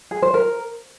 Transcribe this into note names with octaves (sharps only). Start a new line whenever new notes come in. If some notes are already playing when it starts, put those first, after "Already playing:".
G#4
C5
A#4